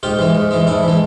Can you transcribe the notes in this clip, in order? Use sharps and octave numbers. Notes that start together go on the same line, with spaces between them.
G#2 F4 G4
E3 G#3
G#2
E3 G#3
G#2 D4 E4
E3 G#3